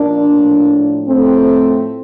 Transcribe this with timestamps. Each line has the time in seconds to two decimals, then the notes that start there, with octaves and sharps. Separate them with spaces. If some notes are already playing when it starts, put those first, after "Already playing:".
Already playing: A#2 F3 A#3 D4
0.28 A2 F3
1.07 A2 F3 A3 C4